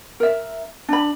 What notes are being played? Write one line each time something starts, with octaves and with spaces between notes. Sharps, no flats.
A#4 E5
D4 B5